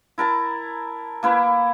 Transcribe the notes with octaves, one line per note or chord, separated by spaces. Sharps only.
E4 A#4 A5 A#5
A#3 E4 B4